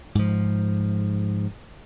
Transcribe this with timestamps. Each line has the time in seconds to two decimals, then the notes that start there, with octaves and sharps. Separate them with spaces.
0.15 G#2 F3